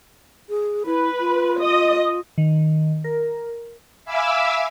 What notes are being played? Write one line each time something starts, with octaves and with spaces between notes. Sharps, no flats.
G#4
E4 B4
F4
D#5
D#3
A#4
E5 F5 G#5 B5 D6 E6